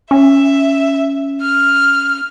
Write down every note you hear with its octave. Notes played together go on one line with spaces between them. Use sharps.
C#4 E5
F6